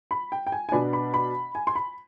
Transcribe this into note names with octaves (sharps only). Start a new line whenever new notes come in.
B5
G5
G5
G#5
G#5
B2 B3 D4 B5
B5
B5
G#5
C6
B5